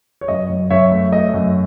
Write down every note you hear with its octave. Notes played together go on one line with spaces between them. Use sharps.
C#5
F#2 D#5
F#2
F#2 C#5 E5
A3
A3 D#5
F#2